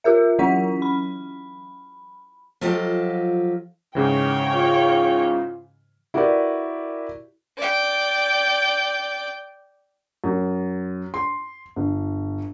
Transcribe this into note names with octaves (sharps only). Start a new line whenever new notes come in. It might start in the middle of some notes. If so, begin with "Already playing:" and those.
F4 G4 A#4 E5
E3 F#3 C#4 E4 F#5 B6
B5
F3 F#3 F4 G4 A4 D#5
G#2 C#3 E3 C#5 G5
F4
E4 F#4 G4 A#4 B4 D5
D5 G5
F#2
C6
G1